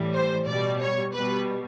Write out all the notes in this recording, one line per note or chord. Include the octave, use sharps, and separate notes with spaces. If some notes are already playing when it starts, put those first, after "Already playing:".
Already playing: A2 E3 G3
C5
B2 G3 D5
C#5
B2 G3 B4